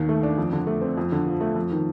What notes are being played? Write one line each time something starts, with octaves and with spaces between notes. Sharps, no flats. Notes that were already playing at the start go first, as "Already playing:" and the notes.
Already playing: D#2 D#3
A3
D4
F2
D3
A3
C4
F2
D3
F3
A3
F2
D#3